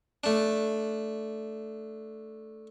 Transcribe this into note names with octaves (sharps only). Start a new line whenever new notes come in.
A3 D4